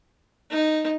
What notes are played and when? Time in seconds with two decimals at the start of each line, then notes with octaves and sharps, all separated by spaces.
0.51 D#4